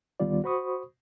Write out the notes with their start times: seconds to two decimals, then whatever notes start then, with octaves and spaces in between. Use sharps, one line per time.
0.20 D2 D#3 G3 B3 F4 D5
0.44 F#4 C5 B5 C#6 D#6